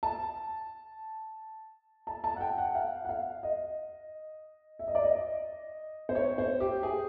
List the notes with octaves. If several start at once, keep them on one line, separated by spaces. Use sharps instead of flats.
A5
A5
A5
F#5
G5
F#5
F5
F#5
F5
D#5
E5
D#5
D5
D#5
C5
C#5
C5
G4
G#4